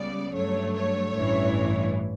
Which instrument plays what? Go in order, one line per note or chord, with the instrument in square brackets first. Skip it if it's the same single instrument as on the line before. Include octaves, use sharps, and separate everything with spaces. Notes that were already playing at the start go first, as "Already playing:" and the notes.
Already playing: [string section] C#2 C#3 G3 B3 D5
G2 F#3 A3 C#5
C#5
A1 G2 E3